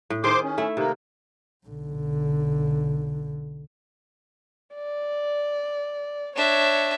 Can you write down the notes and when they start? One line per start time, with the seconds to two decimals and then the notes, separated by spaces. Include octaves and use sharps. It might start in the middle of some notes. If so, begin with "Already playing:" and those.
0.10 A2
0.24 D#3 G#4 C5 C6 D6
0.44 C#4
0.58 A3 E4
0.77 C3 D#3 A#3
1.66 B1 D3
4.75 D5
6.36 D4 C#5 E5